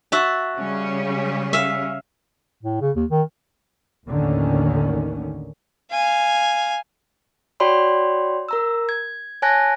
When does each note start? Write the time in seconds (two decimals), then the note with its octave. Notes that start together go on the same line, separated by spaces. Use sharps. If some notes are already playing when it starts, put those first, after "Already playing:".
0.12 F#4 E5 A5
0.56 C#3 G3 C#4
1.53 E5 F5
2.63 A2
2.81 C#3
2.96 D#2
3.10 D#3
4.07 A1 D#2 D3 D#3 C#4
5.91 F5 G#5
7.60 F#4 C#5 D5 G5 B5 C6
8.49 A#4 A#5 E6
8.89 G#6
9.42 C#5 G#5 A5 F#6 G#6 A#6